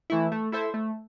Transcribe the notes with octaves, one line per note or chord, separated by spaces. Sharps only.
E3 A3 E4
A3
E4 A4 C5 E5
A3